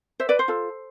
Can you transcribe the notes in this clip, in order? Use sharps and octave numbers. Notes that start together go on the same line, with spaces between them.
C5 E5
B4 D5
C5
F4 A4